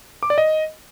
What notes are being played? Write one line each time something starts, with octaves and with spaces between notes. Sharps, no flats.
D6
D5
D#5